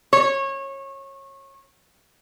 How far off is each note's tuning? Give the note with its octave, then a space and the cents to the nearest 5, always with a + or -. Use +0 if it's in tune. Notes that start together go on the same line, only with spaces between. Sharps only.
C#5 -25